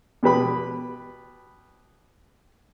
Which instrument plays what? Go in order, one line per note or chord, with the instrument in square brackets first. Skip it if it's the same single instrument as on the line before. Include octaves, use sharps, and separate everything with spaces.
[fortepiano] B2 G4 B4 B5